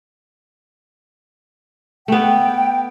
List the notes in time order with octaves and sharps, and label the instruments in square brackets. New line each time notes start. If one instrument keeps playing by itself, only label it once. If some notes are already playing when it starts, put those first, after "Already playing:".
[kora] A3 B3 [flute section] G5